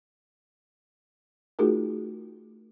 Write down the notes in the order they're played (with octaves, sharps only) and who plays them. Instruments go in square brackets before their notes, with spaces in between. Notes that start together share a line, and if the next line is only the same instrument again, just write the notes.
[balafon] A3 D#4 F4 F#4 G#4 A#4